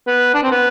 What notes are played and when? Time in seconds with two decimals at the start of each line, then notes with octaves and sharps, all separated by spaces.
0.07 B3
0.34 D4
0.43 C4
0.51 B3